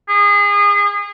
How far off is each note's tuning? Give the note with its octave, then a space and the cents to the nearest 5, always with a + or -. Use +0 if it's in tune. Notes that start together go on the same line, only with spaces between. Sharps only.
G#4 -30